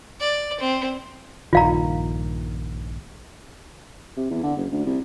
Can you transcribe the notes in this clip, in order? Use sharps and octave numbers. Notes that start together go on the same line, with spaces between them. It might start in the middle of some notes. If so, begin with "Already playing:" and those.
D5
C4
A#1 G2 D#3 F4 F5 A#5
C3
E2
D3
F#1
D2
C2